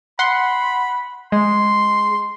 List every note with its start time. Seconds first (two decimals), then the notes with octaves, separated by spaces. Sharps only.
0.19 F#5 B5 C6
1.32 G#3 C6